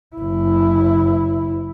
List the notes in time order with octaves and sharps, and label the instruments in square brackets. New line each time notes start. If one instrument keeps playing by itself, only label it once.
[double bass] F#1 E4